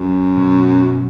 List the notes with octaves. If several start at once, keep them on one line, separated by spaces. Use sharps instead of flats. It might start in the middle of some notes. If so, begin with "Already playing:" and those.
Already playing: F#2
B2 F#3 C#4 F#4